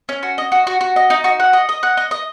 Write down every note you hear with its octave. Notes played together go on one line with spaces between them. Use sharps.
C#4
F#4
D#5
F#4
F#4
F#4
D#5
D#4
F#4
F#5
D#5
D#5
F#5
D#5
D#5